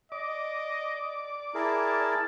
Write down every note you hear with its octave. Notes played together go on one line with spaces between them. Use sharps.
D5 D#5 D6
E4 G#4 A#4 A5